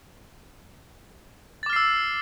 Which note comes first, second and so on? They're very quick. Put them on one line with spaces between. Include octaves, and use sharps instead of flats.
A6 D6 F6 C7 E6